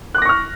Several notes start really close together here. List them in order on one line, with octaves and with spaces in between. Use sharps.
F#6 D6 A#6 C#6 F6